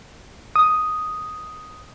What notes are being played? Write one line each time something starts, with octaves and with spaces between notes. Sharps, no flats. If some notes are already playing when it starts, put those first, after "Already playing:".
D#6